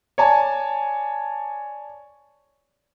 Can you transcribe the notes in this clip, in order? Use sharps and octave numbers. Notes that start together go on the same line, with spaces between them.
C#5 D5 G#5 A5